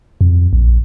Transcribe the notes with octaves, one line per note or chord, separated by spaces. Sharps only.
F2
A#1